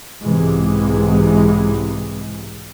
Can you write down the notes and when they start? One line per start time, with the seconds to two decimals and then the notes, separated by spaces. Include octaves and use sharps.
0.22 B1 G#2 C3 E3 G#3